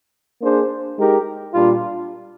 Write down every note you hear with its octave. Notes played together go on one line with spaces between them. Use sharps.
A#3 D4 G#4 C5
G#3 D#4 G4 A#4
A#2 G3 D4 F4